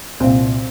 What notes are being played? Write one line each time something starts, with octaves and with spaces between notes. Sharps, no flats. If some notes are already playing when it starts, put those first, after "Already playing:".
C2 A#2 C4